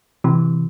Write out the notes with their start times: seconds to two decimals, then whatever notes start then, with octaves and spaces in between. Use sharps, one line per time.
0.24 C3 E3